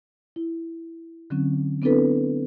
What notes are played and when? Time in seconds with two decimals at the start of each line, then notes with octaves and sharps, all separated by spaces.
0.36 E4
1.30 D3 F#3 C4 C#4
1.82 B3 C4 D4 E4 A4 B4